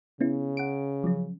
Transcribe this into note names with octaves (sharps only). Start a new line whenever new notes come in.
C#3 B3 C#4 E4
F#5 D7
F3 F#3 C#4